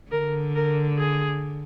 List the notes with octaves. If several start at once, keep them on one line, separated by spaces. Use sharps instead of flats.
D3 A#4
A#4
G#4